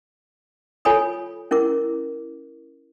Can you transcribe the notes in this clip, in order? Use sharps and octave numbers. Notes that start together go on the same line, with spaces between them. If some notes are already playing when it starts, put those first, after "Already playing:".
F4 A4 C#5 G#5 B5 D#6
C#4 E4 A#4 D6